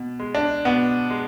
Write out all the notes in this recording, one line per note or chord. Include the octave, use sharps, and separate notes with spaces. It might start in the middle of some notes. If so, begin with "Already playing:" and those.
Already playing: B2
G#3
D4
B2 B3
G#3